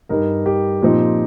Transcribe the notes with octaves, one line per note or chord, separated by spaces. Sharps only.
G2 G3 D#4 A#4
G4
A#2 F3 C4 D#4